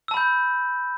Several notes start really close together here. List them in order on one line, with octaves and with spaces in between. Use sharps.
E6 A5 B5 G6